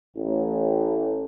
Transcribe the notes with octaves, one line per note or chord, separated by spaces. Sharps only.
A1